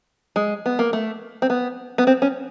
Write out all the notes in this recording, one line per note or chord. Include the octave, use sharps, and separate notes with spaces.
G#3
B3
A#3
A3
C4
B3
B3
C4
C#4